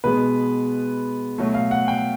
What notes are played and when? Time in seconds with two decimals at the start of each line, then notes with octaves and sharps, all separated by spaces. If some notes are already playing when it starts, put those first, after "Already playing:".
0.04 B2 G#3 B3 B4
1.38 B2 F#3 A3
1.54 F5
1.71 F#5
1.88 G5